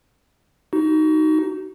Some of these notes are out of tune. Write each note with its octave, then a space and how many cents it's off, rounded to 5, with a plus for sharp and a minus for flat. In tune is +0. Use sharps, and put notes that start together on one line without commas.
D#4 +0 F#4 +30